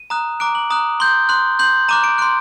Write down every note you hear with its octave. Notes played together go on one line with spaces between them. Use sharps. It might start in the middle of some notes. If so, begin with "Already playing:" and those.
Already playing: D#7
A#5 D#6 F#6
A#5 D6 F#6 D7
F#7
A#5 D#6 F#6
C6 G6 G7
C6 F#6
C6 G6 F#7
A#5 D6 F#6 D#7
D7
C6 F#6 D7